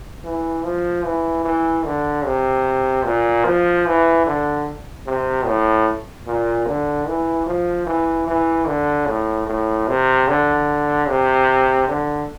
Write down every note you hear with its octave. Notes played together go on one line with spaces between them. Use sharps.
E3
F3
E3
E3
D3
C3
A#2
F3
E3
D3
C3
A2
A#2
D3
E3
F3
E3
E3
D3
A2
A2
C3
D3
C3
D3